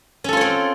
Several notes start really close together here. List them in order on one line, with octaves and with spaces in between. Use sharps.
C#4 A4 F4 C#5 C4